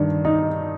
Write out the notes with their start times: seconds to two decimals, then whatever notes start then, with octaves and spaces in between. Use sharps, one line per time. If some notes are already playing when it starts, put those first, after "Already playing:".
Already playing: G2 D#3 D4
0.25 D#4